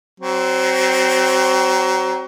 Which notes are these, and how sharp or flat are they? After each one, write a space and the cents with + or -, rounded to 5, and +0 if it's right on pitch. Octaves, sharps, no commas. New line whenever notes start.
F#3 +30 C4 +0